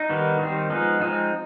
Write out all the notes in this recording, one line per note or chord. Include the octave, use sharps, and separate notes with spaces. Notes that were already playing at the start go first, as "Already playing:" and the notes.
Already playing: D#4
D#3 G3 B3
D#3 G3 C4
F3 G#3 B3 D#4
F3 G#3 C4 D#4